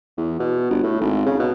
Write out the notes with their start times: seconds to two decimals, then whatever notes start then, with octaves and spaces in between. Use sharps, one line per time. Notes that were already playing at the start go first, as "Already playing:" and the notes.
0.18 E2
0.40 B2
0.70 G1
0.83 A2
1.01 G#1
1.26 C#3
1.39 B2